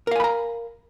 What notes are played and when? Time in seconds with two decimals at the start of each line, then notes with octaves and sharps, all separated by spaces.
0.07 A#4
0.11 F5
0.16 G#5
0.20 B5
0.24 A#5